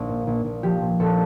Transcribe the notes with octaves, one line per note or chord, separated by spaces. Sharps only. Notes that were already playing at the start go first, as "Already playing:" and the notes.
Already playing: A#1
A#2
A#1
A#1
F3 G4
A#2
A#1 A4